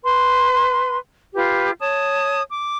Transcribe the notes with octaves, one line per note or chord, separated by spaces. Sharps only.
B4 C6
F4 G4 B4
C#5 A5 D#6
D6